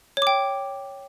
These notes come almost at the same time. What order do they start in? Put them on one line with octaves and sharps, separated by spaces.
C#5 D6 G5